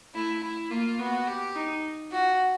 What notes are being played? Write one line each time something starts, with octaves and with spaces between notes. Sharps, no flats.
A3 E4
E4
A#3 F4
B3 F#4
G4
D#4
F4 F#4